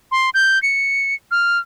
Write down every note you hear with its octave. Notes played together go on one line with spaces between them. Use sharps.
C6
G6
C#7
F6